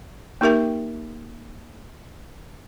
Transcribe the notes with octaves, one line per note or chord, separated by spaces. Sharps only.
A#3 D#4 G4 A#4 E5 G5